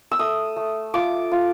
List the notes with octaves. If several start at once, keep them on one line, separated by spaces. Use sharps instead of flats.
E6
A3 D#6
A3
F4 D6
F4